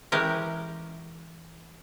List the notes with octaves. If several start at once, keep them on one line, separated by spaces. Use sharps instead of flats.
E3 G#3 C#4 G4 A#4